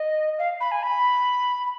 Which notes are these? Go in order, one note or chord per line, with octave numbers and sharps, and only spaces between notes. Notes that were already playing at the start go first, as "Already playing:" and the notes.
Already playing: D#5
F5
B5
G#5
B5